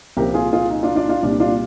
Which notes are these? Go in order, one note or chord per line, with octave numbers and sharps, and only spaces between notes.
C2 A#2 F3 G4 A#4
F4 G#4
F4 G#4
D#4
D4 F4
D4 F4
D4 F4
C2 A#2 G3 D4
D4 F4